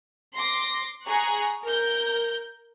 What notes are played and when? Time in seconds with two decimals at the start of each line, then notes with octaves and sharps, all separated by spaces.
0.37 C6 D6 A#6
1.05 G#4 A#5 C#6 F#6
1.63 A#4 G6